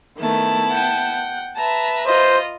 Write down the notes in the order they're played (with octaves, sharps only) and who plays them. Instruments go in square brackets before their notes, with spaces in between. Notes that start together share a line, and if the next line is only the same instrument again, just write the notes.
[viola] D#3 A3 [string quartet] B3 E4 A5
[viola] F#5 G5
[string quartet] B4 E5 A#5 [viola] A5
[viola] F4 D#5 [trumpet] C5